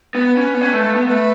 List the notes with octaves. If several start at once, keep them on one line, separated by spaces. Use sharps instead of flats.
B3 B4
C#4
B3
C#4
A3
A3
B3
A3 B4